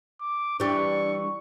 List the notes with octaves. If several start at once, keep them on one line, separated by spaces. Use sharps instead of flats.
D6
E3 G3 D4 C#6